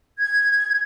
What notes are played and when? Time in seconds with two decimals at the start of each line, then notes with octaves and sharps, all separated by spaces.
0.19 G#6